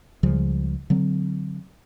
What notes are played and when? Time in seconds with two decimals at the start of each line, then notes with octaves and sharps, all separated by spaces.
0.23 C#2 C#3 F3 G3
0.90 D3 F#3 C4